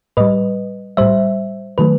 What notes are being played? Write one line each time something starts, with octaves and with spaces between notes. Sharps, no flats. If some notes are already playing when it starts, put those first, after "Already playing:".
A2 G3 B4 D#5
A2 G3 C5 E5
D#3 F#3 A3 B4